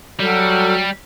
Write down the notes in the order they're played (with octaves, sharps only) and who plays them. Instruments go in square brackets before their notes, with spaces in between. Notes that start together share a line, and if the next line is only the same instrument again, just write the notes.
[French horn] F#3 [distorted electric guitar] G3 [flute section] F#4 A4 F6